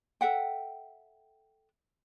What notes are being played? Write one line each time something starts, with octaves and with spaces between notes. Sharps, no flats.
A4 E5 F#5 G5